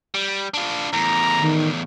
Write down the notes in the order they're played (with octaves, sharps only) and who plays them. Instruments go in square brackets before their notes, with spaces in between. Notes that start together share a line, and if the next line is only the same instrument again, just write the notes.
[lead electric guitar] G3
D4 F4
[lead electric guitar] E2 A2 [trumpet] A#5
[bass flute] D#3